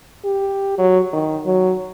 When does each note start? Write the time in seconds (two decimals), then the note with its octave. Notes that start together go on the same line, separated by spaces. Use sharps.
0.25 G4
0.78 F#3
1.13 D#3
1.45 F#3